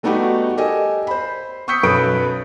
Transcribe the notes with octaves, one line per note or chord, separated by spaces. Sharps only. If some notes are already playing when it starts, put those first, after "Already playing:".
G3 A3 B3 D#4 F#4 G4
G4 A4 A#4 D#5 G#5
C5 B5
C#6 D#6 E6 G6 B6 C#7
B1 F#2 A4 B4 D#6 D7